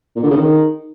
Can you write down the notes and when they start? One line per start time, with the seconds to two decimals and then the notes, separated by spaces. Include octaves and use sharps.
0.16 A#2
0.23 D3
0.30 C#3
0.37 D#3